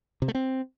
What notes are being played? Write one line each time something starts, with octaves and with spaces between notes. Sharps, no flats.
C3
A3
C4